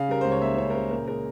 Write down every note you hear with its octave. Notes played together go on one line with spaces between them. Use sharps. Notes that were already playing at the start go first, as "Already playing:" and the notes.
Already playing: C#3 F5
G3 A#4
C#2 C5
C#5
A#3 E5
C#3 C#5
A#4
C#3 C5
A#2 A#4
G#3 A#4